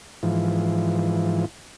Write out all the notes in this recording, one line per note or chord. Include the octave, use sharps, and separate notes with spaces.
G#2 E3 F3